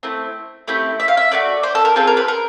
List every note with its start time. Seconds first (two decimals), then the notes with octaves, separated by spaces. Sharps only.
0.03 A3 C4 E4
0.68 A3 C4 E4 G4
1.00 E5
1.08 F5
1.17 E5
1.31 A3 D4 F#4 D5
1.63 C5
1.75 A4
1.85 A#4
1.96 C4 F4 G#4 A4
2.07 A#4
2.17 B4
2.28 A#4